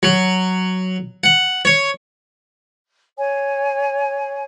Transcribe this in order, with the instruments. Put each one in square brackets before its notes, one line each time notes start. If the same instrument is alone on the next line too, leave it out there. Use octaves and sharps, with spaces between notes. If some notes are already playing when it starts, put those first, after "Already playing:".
[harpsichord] F#3
F#5
C#5
[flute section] C#5 G#5